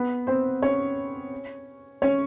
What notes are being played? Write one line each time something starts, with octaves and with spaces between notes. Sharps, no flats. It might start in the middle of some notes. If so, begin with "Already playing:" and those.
Already playing: B3 B4
C4 C5
C#4 C#5
C#4 C#5